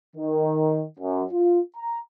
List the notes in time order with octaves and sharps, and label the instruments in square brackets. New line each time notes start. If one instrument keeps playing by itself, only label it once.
[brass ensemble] D#3
F#2
F4
A#5